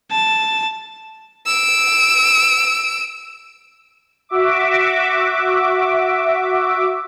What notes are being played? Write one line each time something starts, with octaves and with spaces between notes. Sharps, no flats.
A5
E6 D7
F#4 E5 D6